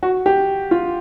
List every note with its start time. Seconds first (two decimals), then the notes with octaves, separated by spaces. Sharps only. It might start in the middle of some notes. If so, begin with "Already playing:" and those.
0.03 F#4
0.26 G4
0.71 F4